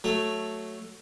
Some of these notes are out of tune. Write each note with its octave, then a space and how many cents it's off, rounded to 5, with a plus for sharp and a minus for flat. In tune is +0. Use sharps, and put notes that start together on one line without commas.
F#3 +0 A3 +0